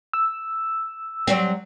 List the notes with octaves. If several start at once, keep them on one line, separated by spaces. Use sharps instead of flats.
E6
F#3 G3 C4